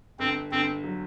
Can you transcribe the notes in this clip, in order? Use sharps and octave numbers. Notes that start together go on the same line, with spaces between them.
G1 C4
G1 C4
F#3